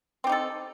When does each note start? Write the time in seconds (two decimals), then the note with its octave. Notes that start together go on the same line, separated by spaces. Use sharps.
0.24 C4
0.27 G4
0.29 D#4
0.32 A4